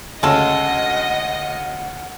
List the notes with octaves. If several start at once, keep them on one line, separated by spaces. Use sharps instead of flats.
D2 C#3 G#3 A4 C#5 D#5 F#5